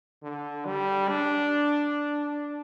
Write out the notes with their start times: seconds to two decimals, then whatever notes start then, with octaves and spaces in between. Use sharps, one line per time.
0.23 D3
0.65 G3
1.09 D4